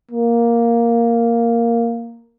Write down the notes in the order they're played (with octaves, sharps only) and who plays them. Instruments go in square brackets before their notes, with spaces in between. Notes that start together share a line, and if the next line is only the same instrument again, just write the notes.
[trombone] A#3